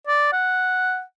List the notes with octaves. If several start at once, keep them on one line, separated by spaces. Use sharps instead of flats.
D5
F#5